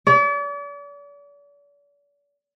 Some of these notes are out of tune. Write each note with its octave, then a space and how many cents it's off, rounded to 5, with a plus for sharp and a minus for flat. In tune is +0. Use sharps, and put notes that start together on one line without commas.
D5 -40